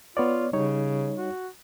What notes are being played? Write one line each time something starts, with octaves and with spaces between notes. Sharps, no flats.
B3 F4 C#5 D5
C#3 G3 D#4 C#5
F#4